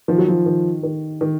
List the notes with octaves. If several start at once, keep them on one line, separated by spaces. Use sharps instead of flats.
D#3 F3
F#3
F3
D#3
D#3
D#3